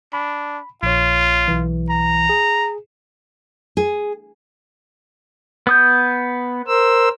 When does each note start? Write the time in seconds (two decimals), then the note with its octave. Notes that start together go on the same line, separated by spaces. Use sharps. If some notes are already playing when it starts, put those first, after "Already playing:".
0.13 D4 B5
0.83 A#1 F4 C#5
1.48 B1 E3
1.90 A#5
2.29 G#4
3.77 G#4
5.67 B3 D#6 G6
6.67 A#4 C5 E6